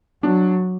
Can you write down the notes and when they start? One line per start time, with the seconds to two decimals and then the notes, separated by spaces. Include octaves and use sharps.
0.23 F#3 D4